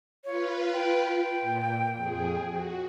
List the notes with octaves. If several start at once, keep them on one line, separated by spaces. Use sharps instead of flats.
F4 B4 C#5
G5
A#2
F2 G#4
F#4